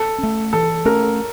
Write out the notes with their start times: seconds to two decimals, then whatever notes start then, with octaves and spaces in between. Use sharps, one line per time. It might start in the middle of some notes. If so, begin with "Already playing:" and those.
Already playing: A4
0.18 C#4
0.23 A3
0.53 E3 A4
0.85 A3 C#4 A#4